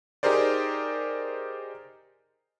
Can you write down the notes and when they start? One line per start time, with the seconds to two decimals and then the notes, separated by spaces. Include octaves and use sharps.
0.23 D#4 G4 G#4 A#4 C5 D5